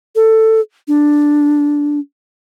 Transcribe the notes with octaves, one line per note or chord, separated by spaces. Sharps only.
A4
D4